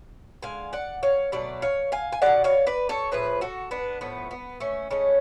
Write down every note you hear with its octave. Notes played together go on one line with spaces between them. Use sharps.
D3 G#3 F5 G#5
D5 F#5
C#5 F5
B2 F#3 A3 D5
C#5 F5
F5 G#5
G#5
B2 G#3 D5 F#5
C#5 F5
B4 D5
A4 C#5
A2 F3 A3 G#4 B4
F#4 A4
B3 D4
A2 F3 A3 B3
B3
A3 C#4
C#3 G#3 A3 C#4